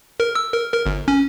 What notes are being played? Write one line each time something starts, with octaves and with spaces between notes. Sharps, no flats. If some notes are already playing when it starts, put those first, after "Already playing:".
A#4
E6
A#4
A#4
G1
C#4